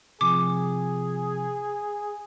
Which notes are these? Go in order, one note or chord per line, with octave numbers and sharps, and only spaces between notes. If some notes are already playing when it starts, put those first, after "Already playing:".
C3 F3 G#4 D6